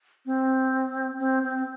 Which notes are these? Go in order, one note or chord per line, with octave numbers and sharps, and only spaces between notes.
C4
C4
C4